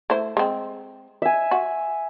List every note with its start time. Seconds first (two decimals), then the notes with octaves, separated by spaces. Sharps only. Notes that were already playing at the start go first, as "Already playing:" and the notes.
0.10 A3 E4 C5
0.37 G#3 C4
1.22 E5 G#5
1.51 F#4